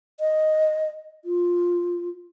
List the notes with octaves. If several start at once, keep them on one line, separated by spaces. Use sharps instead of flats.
D#5
F4